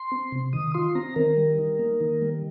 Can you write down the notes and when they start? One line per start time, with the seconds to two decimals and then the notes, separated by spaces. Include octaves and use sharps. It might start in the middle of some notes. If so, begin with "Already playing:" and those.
Already playing: C6
0.12 C4
0.32 C3
0.53 D#3 D#6
0.74 F4 C6
0.95 C4 A#5
1.16 D#3 A#4
1.37 G3
1.58 D#4
1.79 A#3
2.01 D#3
2.22 G3